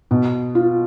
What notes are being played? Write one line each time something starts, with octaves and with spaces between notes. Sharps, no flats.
B2
F4